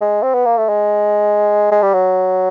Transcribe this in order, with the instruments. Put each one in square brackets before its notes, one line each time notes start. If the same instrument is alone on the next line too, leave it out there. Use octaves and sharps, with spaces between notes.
[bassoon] G#3
C4
B3
A#3
A3
G#3
G#3
G3
F#3